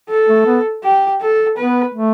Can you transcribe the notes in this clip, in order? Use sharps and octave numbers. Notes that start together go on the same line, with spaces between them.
A4
A3
B3
G4
A4
B3 B4
A3